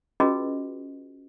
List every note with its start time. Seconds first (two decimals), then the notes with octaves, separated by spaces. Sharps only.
0.20 C#4 F4 F#4 G#4 B4 D#5